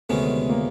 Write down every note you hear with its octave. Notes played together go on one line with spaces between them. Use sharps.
D2 C3 D#3 G#3 B3 C#4
A#3